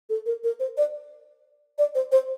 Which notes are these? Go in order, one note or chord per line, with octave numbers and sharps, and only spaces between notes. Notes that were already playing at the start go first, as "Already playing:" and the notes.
A4
A#4
A#4
C5
D5
D5
C5
C5